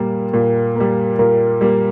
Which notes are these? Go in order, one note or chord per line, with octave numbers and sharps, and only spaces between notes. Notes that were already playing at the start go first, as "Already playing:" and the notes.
Already playing: A#2 G3 A#3
A#2
G3 A#3
A#2 A#4
G3 A#3